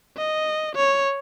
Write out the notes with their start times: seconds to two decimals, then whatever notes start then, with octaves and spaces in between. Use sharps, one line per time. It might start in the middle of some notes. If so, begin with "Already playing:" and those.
0.17 D#5
0.75 C#5